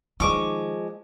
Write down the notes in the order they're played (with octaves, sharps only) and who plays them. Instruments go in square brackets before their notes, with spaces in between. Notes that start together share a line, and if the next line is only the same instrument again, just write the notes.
[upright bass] D#3 D#4 [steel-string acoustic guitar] F3 G#3 [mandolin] C#6 D6